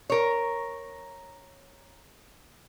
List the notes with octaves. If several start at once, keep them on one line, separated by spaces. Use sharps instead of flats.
A#4 C#5